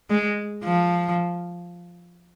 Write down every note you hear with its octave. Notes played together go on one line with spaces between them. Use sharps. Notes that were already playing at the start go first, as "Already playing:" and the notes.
G#3
F3